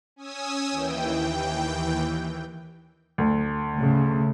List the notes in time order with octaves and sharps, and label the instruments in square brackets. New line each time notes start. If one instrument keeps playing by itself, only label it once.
[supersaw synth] C#4 G#5 D#6 E6
D#2 E3 G5
[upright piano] D2
[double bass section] C#3 A3